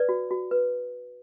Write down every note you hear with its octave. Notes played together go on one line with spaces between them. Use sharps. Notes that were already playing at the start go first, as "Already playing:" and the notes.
Already playing: B4 D5
F#4
F#4
B4